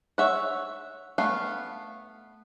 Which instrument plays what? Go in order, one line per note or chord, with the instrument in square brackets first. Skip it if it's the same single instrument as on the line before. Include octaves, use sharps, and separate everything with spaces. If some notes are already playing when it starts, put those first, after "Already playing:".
[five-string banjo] C#5 E5 F#5
A3 B3 F5